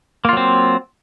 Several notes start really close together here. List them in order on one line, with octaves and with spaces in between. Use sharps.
A#3 F4 F#3 C4